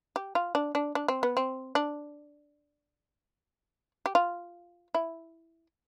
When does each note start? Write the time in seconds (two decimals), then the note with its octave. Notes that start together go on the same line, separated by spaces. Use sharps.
0.16 G4
0.35 F4
0.55 D4
0.75 D4
0.95 D4
1.08 C4
1.23 B3
1.37 C4
1.75 D4
4.06 G4
4.15 F4
4.95 E4